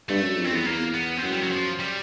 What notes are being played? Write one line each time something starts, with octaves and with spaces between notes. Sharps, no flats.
G2 A3
F#2
F2
C4
E2 B3
E2 A#3
B3
C4
F#2 B3
G3
F#3
F3
G3